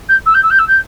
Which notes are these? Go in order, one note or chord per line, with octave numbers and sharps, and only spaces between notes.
G6
E6
G6
E6
G6
E6
G6